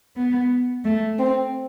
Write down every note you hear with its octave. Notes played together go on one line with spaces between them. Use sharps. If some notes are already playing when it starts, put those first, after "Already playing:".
B3
A3
C4